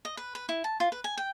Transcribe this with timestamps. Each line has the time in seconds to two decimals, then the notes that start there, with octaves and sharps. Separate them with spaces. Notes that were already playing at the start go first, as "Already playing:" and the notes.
0.05 D#5
0.17 B4
0.35 B4
0.49 E4
0.64 A5
0.80 F4
0.92 B4
1.04 G#5
1.17 G5